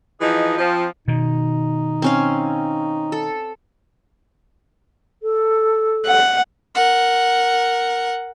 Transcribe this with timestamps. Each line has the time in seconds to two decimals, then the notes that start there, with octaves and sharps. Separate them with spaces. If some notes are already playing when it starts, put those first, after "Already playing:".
0.21 E3 F3 D#4 G#4 D#5
0.58 F3 C4
1.08 B2 D#3 D#4
2.02 C4 C#4 F5
3.12 A4
5.22 A4
6.07 F#5
6.75 A#4 F#5